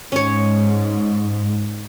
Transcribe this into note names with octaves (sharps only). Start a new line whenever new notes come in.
G#2 C#4 C#5